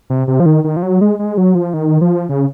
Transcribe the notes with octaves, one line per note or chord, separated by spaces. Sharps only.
C3
C3
F3
D#3
D#3
F3
F#3
G#3
G#3
F#3
F3
D#3
F3
C#3